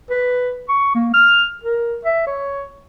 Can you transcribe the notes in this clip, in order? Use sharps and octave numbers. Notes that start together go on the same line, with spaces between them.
B4
C#6
A#3
F6
A#4
E5
C#5